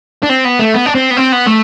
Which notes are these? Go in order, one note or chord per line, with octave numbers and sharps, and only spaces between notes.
D4
C4
B3
A3
B3
D4
C4
B3
C4
B3
A3